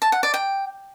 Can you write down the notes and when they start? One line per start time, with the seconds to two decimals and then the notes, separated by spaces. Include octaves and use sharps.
0.02 A5
0.12 F#5
0.23 D5
0.34 G5